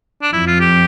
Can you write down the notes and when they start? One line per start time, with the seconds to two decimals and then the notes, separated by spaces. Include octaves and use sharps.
0.22 D4
0.32 F2 E4
0.47 F4
0.60 G4